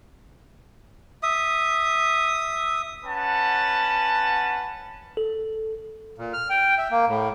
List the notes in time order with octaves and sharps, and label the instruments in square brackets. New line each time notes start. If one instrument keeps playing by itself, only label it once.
[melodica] E5 D#6
[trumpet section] C#4 B4 F#5 A5
[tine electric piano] A4
[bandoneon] A#2
F6
G5
E5
A#3
A2